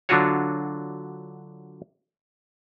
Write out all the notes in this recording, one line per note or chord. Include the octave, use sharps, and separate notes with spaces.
D3 F#3 D4 F4 F#4 C#5